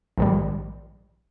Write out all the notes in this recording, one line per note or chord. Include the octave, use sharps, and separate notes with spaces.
A#1 G#2 D#3 G3